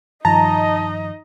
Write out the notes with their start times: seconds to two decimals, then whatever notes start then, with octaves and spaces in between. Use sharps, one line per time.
0.25 G2 D#3 F3 D#4 D#5 A5 A#5